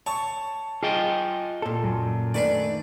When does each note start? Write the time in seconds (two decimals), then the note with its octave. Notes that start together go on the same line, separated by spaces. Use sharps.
0.06 C#5 A5 C#6
0.83 F4 G#4 D#5 G5
1.62 A#2 A4
1.84 F#2
2.34 D#3 A3 D4 B4 D5